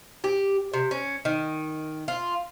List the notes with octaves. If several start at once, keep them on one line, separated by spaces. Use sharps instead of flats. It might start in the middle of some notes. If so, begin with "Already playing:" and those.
G4
C3
C#4
D#3
F4